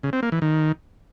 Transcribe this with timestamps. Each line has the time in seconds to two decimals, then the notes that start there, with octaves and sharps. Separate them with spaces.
0.03 C#3
0.13 C4
0.23 A#3
0.32 E3
0.42 D#3